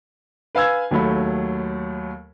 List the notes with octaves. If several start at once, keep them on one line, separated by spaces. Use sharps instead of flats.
B4 F5 G#5 E6 G#6
D#2 F#3 A3 B5